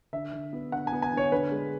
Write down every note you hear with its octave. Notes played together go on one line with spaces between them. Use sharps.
D3 E5
D3
B3
D3 F#5
G#5
B3
G#5
D3
C#5
D3 B4
G#3